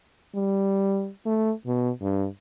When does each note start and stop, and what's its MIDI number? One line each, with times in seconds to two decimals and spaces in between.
0.35 1.10 55
1.26 1.52 57
1.66 1.90 47
2.02 2.26 43